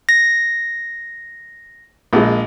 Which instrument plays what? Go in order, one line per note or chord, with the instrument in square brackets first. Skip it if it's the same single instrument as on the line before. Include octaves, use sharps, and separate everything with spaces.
[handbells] A#6
[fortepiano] A#1 G#3